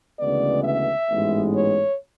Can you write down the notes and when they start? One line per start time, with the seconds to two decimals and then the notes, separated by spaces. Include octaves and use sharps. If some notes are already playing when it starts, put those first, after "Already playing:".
0.19 D2 C#3 E3 G#3 B3 D5
0.64 E5
1.10 A1 G#2 G#3 B3
1.55 C#5